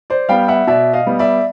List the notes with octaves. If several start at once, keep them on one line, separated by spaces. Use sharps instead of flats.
C5 D5
G3 B3 F5 G5
E5 F#5
B2 D5 E5
D#5 F5
G3 B3
D5 E5